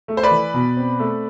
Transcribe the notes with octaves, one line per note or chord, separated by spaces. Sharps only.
A3
C5
B4 D5
E3
B2
C4
A3